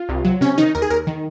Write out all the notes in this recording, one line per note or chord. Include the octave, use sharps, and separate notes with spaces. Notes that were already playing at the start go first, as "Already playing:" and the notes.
Already playing: F4
C2
F#3
C3 C#4
D#3 D#4
D#2 A#4
G#4
D#2 A#4
D#3